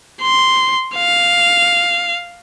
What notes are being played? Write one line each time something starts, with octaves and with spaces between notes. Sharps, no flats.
C6
F5